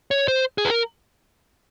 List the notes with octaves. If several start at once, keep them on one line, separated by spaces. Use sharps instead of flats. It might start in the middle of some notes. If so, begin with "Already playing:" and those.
C#5
C5
G#4
B4
A#4